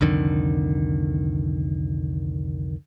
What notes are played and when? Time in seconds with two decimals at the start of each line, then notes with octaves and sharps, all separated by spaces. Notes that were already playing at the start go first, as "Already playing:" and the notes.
0.01 C2 F2 D3 D#3